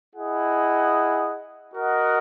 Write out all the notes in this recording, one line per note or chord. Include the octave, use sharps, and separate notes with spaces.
E4 G#4 D#5 F#5
F#4 A#4 D#5 F#5